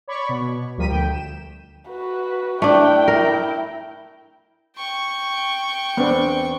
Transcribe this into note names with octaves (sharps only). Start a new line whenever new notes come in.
C#5 D5 B5 C#6
B2
D2 F3 G3 A#4 B6 D#7
D2 G5
E7
F#4 B4
A3 D4 E4 G5
A#4
G5 C#6
E2 B3 C4 D4